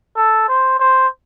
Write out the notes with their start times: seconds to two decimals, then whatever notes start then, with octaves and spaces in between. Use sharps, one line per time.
0.16 A4
0.48 C5
0.79 C5